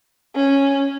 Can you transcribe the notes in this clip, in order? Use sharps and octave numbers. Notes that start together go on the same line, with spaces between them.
C#4